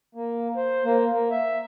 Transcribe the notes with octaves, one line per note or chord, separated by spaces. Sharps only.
A#3
C5
A#3
A#3
E5